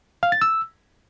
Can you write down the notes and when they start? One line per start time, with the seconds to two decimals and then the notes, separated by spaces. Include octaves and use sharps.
0.23 F5
0.32 A6
0.42 E6